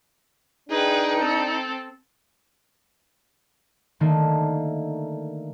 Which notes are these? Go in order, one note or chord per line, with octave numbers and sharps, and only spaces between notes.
D4 D#4 G#4 B4 G5
C4 A4
D3 D#3 A3 A#3